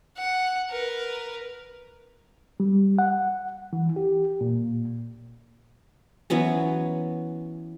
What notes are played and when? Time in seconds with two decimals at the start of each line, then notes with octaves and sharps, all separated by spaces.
0.17 F#5
0.70 A#4 B4
2.60 G3
2.99 F#5
3.73 E3
3.96 G4
4.41 A#2
6.30 E3 F#3 B3 C#4